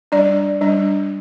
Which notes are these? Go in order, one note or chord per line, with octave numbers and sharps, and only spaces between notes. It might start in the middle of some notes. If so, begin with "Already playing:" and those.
G3 D4 D5
G3 D4